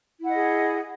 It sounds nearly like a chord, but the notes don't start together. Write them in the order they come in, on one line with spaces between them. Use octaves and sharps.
E4 F#5 D#5 G#4